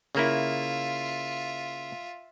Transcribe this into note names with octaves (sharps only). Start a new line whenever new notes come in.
C#3 A#3 E4 F4 E5